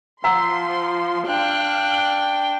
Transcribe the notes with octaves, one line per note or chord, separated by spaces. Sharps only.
F3 F#5 A#5 C6 E6
D4 F5 G5 F#6